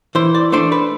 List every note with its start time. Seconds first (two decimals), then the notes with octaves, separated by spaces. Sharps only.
0.15 E3 C5
0.35 D5
0.52 A3 D4 C5
0.72 B4